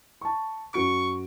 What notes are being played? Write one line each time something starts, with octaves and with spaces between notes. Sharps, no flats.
A5 C#6
F#2 F#4 C#6 D7